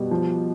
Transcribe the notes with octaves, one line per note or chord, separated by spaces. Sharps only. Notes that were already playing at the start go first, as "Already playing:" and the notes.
Already playing: B2 G3
F3